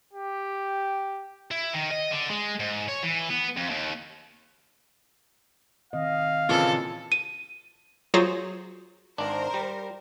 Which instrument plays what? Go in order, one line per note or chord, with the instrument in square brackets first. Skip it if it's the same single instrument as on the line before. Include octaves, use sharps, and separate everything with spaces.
[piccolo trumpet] G4
[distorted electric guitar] E4
D#3
D#5
D3
G#3
G#2
C#5
E3
B3
F2
D#2
[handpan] D#3 C4 D#5 [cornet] F5
[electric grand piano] A#2 C#3 E3 [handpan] C4 F4 [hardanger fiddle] A4
[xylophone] D#7
[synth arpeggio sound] F#3 F4 F#4 G#4 C5 C#5
[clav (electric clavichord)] G#1 D4 [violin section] A#4 C5
[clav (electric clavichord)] G3